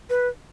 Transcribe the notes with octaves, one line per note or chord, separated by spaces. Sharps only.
B4